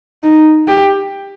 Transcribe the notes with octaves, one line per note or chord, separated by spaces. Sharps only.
D#4
G4